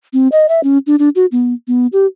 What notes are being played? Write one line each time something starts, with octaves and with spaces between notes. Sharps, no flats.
C4
D#5
E5
C#4
D4
D4
F#4
B3
B3
G4